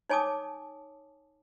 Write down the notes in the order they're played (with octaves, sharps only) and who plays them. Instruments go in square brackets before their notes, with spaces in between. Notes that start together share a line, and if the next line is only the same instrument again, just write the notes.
[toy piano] D#4 C#5 G#5 A5 D6 D#6